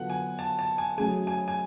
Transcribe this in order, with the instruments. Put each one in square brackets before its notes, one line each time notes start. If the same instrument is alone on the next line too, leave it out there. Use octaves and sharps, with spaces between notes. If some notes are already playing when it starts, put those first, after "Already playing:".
Already playing: [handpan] D3 F#3 B3 F4 A4 [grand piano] F#5
[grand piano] G#5
A5
A5
G#5
[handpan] F#3 A3 C#4 G#4 [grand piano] G#5
[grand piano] G#5
G#5